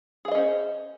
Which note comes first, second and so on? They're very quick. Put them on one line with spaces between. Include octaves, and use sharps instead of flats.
G#4 F5 D#5 C#4 C5